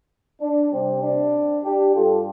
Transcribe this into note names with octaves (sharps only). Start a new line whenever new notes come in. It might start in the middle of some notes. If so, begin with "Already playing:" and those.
D4
C3 G3 C4
D4
D4 G4
G2 G3 F4 A4